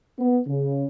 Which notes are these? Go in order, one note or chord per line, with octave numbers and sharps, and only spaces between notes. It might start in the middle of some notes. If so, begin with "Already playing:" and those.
B3
C#3